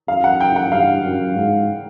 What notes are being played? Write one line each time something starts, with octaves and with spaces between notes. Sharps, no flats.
F#2 F5
F#5
G5
F#5
G2 F5
F#2
G#2